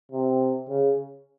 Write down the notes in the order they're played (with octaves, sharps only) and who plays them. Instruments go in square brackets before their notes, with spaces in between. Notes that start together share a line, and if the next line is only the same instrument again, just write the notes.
[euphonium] C3
C#3